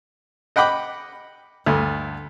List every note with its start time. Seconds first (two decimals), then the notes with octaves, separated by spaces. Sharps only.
0.56 D#5 F#5 G5 B5 D6
1.66 D2 G2 A3